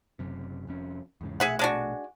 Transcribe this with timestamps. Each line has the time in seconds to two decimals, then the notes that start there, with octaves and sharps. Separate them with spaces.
0.19 F#1 F#2 C3
0.67 F1 F2 C#4
1.21 E2 G#2 C#3
1.40 A#1 B2 A3 G#4 E5 F#5
1.59 G#3 D4 F#4